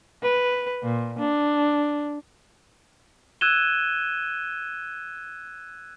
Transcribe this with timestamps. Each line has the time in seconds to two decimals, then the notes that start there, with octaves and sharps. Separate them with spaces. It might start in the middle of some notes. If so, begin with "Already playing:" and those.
0.22 B4
0.83 A#2
1.19 D4
3.41 E6 F#6 G#6 D#7 E7 G7